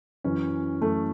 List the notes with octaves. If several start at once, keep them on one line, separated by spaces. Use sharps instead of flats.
F#2 E3 C#4
F#2 E3 A3